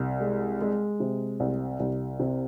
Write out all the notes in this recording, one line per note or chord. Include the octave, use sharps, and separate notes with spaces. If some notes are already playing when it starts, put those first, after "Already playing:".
Already playing: C2
G#3
G#3
C3
C2
C2
C3